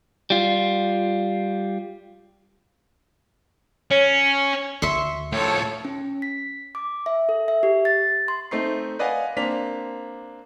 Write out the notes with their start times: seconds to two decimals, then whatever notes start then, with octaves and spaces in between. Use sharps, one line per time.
0.30 G3 F4
3.91 C#4 C#5
4.82 D2 E5 C6 C#6
5.32 A2 F3 A4 C#5
5.85 C#4
6.22 B6
6.75 D6
7.06 E5
7.29 A4
7.48 E5
7.63 G4
7.85 A6
8.28 C6
8.51 A3 C4 D#4 C7
8.99 B4 D5 D#5 F5 F#5 G#5
9.37 A#3 C4 D4 B6 F7